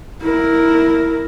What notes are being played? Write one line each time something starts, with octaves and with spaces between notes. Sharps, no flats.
E4 A#4